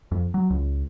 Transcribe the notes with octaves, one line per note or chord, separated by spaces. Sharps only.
F2
F#3
C#2